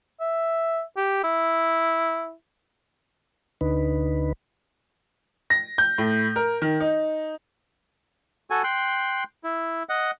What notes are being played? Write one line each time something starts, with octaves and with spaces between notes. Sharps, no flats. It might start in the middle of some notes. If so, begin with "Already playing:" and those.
E5
G4
E4
D2 D3 D#4 B4
A#6
G6
A2
A#4
D#3
D#4
F#4 A4 G#5
G5 C6 F#6
E4
D#5 F#5